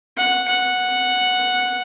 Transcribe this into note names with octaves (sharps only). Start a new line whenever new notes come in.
F#5
F#5